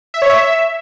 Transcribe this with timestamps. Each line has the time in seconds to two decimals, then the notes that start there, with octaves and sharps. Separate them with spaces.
0.14 E5
0.22 C#5
0.30 E5